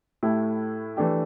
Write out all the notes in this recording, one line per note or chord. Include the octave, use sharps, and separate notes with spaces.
A2 A3 E4 G4
E3 A3 D4 G4